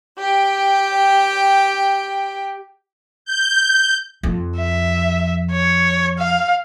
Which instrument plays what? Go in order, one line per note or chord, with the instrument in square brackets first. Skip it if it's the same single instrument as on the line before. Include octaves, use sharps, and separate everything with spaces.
[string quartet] G4 G5
[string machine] G6
[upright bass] F2
[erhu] E5
C#5
F5